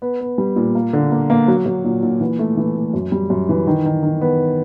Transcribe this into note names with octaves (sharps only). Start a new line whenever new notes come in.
B3
B3
G3
A#2
A#3
D3
A#3
A#3
F#3
F#3
A#2
A#2
E3
A3
E3
A3
F#2
G3
F#2
E3
D#3
D#3
D#3
B3